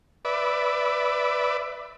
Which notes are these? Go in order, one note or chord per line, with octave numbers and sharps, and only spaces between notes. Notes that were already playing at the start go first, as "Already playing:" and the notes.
B4 D5 E5